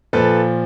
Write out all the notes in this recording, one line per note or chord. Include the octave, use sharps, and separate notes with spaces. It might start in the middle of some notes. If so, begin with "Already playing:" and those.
A#2 F3 A4 B4